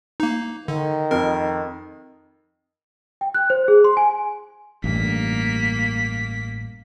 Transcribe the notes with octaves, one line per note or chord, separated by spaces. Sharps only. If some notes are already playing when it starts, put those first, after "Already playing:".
A#3 D#4
D3 D#3
F2 A#4
G5
F#6
C5
G#4
C6
G#5
A1 G2 A#3 B6